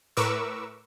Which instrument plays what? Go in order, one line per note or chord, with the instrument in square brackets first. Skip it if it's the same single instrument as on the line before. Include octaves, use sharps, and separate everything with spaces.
[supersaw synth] A2 A#4 B4 C#6 D6 E6